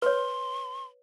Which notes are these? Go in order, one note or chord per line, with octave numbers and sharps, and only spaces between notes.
B4 C#5 C6